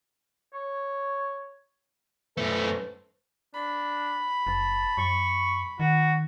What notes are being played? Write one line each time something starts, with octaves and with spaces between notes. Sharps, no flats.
C#5
F#2 A3 A4 B4 C5
D4 B5
F#1 A5
F#2 C#6
D#3 F#4